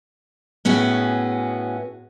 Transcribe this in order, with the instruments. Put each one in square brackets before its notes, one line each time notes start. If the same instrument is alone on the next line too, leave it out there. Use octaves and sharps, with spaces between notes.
[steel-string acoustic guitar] A2 B3 C#4 F#4 G#4